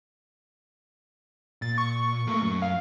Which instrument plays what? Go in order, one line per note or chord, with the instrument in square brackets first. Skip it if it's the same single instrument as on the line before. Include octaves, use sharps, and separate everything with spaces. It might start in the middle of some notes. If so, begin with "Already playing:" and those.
[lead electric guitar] A#2 [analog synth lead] A6
[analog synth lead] C#6
[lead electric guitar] A3 A#3
F#2
[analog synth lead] F5